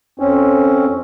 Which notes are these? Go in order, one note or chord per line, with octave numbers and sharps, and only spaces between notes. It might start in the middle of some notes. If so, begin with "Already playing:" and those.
F2 C4 C#4